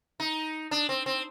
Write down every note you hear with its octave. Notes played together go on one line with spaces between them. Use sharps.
D#4
D4
C4
C4